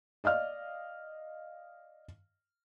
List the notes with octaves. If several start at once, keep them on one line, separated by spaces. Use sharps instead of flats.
D5 D#5 F5 F6